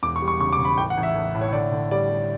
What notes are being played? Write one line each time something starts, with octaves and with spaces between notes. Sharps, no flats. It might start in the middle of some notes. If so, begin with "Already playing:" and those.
E1 D6
C#6
G3
C#6
C#3 C#6
D6
C#3
B5
A1 G5
F#5
A1
E5
A1
A2
C#5
D3 D5
D3
G3 D5
G3